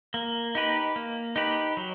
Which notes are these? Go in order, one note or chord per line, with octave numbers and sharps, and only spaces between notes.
A#3
D#4 G4 B4
A#3
D#4 G4 B4
F#3